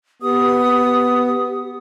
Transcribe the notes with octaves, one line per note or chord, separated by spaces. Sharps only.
B3 G4 D#6